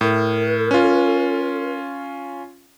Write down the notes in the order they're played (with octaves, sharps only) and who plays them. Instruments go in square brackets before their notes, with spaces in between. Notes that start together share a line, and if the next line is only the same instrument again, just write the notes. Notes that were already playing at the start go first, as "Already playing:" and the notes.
[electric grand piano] A2 [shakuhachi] A#4
[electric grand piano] C#4 F4